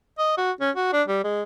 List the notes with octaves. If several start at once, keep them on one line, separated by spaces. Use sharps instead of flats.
D#5
F#4
C#4
F#4
D4
G3
G#3